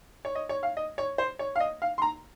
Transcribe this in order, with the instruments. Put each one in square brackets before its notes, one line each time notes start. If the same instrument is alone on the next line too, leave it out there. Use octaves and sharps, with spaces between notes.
[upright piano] C#5
D#5
C#5
F5
D#5
C#5
C5
C#5
F5
D#5
F5
C6
A#5